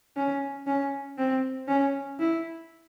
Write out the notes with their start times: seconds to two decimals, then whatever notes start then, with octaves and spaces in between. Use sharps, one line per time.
0.16 C#4
0.67 C#4
1.18 C4
1.68 C#4
2.19 E4